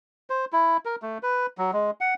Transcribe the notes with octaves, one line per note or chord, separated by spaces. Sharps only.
C5
E4
A#4
A3
B4
F#3
G#3
F#5